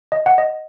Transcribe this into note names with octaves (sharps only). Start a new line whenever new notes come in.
D#5
F#5
D#5